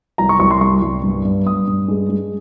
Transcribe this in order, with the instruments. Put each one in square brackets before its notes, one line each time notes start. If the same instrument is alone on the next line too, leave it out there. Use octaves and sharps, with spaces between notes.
[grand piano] C2 A#5
C#6
C2 C#6
C6
G3 C#6
C2
G2
G2
G2 D#6
G2
G#3
G#3